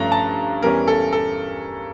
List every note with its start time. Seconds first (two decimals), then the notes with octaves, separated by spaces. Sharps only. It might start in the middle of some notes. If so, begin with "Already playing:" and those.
Already playing: G2 F3 A3 C#4 A#5
0.12 A5
0.62 E2 E3 G3 C#4 A#4
0.88 A4
1.13 A4